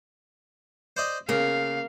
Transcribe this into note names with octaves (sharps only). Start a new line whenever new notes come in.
C5 D5 D#5
C#3 A#3 F5